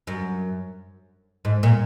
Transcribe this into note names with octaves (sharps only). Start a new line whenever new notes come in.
F#2
G#2
A#2